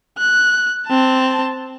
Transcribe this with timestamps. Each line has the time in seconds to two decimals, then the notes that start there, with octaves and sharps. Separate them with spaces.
0.18 F#6
0.87 C4 A5